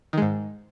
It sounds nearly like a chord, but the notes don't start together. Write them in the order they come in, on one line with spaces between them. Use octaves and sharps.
D#3 G#3 G#2